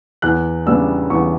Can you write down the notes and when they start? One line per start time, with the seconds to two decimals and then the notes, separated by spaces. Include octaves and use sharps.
0.22 E2 F#6
0.66 C#3 G3 B3 D4 E6
1.10 E2 C#6